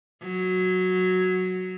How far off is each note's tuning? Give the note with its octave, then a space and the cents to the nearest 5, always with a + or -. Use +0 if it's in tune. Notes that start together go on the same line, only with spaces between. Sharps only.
F#3 -5